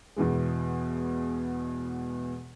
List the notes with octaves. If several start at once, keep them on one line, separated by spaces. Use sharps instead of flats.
E2 B2 E3 G#3